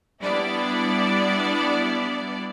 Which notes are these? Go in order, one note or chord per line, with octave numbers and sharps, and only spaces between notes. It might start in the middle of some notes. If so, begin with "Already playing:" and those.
G3 B3 D4 E4 D5